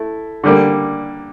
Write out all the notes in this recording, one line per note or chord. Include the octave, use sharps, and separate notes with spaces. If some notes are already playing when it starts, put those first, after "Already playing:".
Already playing: A3 E4
D3 G3 A#3